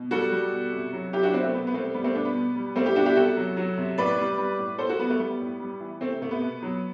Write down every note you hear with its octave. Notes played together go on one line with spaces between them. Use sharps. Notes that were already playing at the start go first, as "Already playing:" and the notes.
Already playing: B2
G3 F#4 A4
G3
B2
C3
F#3
F#3 E4 G4
D4 F#4
C3 C4 E4
A3 C4
B2 B3
B3
G3 A3 C4
G3 B3
A3 C4
B2 B3 D4
B3
B2
G3
G3 A3 C4
E4 G4
B2 D4 F#4
E4 G4
C3 F#4 A4
F#3
F#3
C3
A2 B4 D5
G3
G3
A2
A2 A4 C5
F#4 A4
G3 B3
A3
G3 B3
A2
G3
E3
C3 A3 C4
C3 A3
B3
B2
F#3